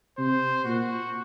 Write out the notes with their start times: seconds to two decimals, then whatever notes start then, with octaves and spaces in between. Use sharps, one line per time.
0.18 C3 C5
0.64 A#2 F#4